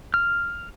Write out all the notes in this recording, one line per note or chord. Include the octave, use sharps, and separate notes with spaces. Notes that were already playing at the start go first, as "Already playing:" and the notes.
F6